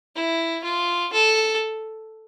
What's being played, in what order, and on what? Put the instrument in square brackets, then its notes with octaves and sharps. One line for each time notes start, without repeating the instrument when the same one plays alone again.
[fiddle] E4
F4
A4